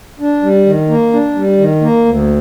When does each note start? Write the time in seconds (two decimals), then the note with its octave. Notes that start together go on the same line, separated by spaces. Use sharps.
0.20 D4
0.42 G3
0.66 D#3
0.89 A#3
1.13 D4
1.35 G3
1.58 D#3
1.81 A#3
2.05 D2